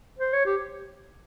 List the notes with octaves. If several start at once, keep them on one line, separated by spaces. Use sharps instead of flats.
C5
C#5
G4